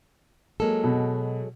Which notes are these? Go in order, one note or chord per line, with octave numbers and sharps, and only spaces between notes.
F#3 G#3 A#3 A4
B2